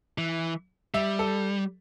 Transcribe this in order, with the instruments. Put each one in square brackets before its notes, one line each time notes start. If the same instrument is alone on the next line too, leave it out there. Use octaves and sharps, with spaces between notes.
[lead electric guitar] E3
[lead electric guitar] G3 [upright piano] E5
[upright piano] A4